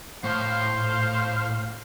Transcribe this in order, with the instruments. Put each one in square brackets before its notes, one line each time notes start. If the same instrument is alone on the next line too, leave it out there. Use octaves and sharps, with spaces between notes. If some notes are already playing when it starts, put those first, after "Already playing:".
[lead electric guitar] A2 [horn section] C5 F5